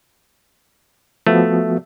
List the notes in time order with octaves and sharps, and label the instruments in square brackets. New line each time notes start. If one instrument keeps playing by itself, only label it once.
[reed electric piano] F3 B3 F#4 [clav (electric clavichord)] A3